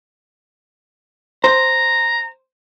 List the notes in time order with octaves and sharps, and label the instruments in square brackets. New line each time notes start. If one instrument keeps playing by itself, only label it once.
[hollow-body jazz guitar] C5 [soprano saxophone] A#5